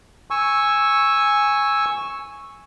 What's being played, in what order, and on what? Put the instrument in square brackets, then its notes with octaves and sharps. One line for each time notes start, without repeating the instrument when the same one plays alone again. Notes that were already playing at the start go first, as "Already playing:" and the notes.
[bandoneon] G#5 C#6 E6